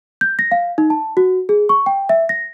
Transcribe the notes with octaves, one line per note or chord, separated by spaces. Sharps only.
G6
A#6
F5
D#4
A5
F#4
G#4
C#6
G5
E5
A#6